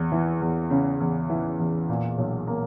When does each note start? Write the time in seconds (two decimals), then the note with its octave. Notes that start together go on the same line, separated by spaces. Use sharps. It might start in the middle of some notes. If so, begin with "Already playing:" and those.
Already playing: E2
0.12 E3
0.41 E2
0.70 C#3
1.00 E2
1.30 E3
1.59 E2
1.89 A#2
2.18 B1
2.47 A#3